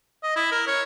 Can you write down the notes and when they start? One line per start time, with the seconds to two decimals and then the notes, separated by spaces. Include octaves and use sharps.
0.23 D#5
0.36 E4
0.51 A#4
0.67 C#5